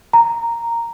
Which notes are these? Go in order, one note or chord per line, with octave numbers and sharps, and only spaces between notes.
A#5